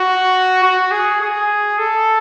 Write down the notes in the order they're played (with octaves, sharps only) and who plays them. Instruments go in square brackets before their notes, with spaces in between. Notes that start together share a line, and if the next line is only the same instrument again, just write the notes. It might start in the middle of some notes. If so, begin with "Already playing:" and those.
Already playing: [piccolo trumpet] F#4
F#4
G#4
G#4
A4